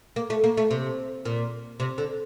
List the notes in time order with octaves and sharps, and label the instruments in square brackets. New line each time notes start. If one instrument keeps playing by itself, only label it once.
[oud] A#3
A3
A#3
A3
C3
A#2
C3
D3